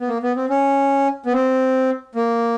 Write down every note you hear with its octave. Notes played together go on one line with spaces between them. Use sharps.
B3
A#3
B3
C4
C#4
B3
C4
A#3